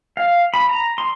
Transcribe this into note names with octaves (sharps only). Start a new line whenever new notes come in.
F5
B5
A#5
C6